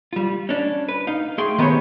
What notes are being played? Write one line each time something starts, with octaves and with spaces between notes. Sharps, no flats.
G3 F4
C#4 D4
B4
D#4 F5
A3 G#4 G5 C6
D#3 B3 G4 G#4 C#5